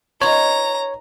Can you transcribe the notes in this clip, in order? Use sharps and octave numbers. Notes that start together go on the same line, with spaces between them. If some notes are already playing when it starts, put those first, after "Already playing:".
D#4 F4 B4 C#5 A#5